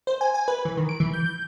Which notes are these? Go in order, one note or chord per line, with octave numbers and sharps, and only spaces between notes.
C5
G#5
G#5
B4
E3
D#3
D7
E3
G6
G6